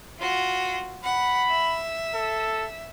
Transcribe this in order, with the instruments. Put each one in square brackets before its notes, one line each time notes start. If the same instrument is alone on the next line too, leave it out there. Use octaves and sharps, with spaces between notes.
[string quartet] F4 F#4
[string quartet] F#5 [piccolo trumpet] B5
[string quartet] E5
[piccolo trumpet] A4